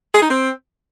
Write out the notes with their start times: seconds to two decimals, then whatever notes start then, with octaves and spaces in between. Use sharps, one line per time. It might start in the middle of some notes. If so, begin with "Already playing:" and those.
0.14 G#4
0.22 D#4
0.30 C4